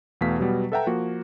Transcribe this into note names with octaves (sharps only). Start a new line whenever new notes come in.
E2 B2 A3 F5 B6
B2 F#3 G3 B3
A4 B4 E5 F#5 G5 A#5
F3 A#3 F#4